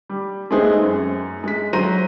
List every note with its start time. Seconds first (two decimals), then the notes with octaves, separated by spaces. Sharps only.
0.10 G3
0.51 G#3 A3 B3 C4 D#4 G#4
0.83 F#2
1.44 G#3 B6
1.73 F#3 C5 A#5 C6 A#6 D#7